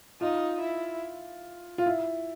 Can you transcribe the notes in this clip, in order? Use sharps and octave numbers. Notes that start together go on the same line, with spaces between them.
D#4 F4
E4
F4
E4